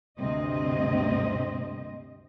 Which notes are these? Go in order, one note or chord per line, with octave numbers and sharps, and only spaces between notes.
D2 G2 C3 C4 D#5